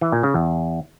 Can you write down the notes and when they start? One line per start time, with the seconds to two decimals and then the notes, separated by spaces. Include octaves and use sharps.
0.01 E3
0.12 A#2
0.23 C#3
0.34 E2